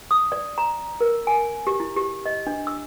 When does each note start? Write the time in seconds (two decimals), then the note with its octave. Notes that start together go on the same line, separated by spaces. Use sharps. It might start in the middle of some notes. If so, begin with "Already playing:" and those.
0.11 D#6
0.32 D5
0.58 A#5
1.01 A#4
1.27 G#5
1.67 G4
1.80 E4
1.97 G4
2.26 D#5
2.47 D4
2.67 E6